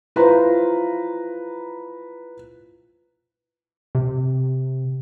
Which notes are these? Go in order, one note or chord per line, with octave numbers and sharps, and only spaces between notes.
E4 F4 B4 C5 A#5
C3